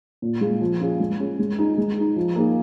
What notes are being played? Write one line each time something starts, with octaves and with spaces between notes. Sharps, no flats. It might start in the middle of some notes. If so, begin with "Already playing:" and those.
A#2
G#3 F4 G#4
F3
C#4 F4 G#4
G#3
C#4 G#4
G#3
D#4 G#4
G#3
D#4 G#4
F3
A#3 D#4 G#4